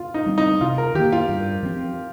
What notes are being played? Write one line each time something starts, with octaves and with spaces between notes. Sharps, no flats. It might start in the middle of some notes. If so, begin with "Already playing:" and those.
Already playing: F4
D#4
G3 C4
D#4
C3 F4
A#4
D#3 A#3 G4
F4
G2
F3 C4